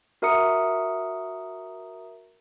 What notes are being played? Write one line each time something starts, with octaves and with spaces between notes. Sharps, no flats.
F#4 A#4 E5 A#5 D#6 C#7